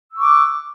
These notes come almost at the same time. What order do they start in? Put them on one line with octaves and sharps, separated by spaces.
E6 C#6 D6 F#6